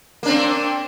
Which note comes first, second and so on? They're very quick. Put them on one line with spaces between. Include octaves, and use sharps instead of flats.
A#3 D4 C4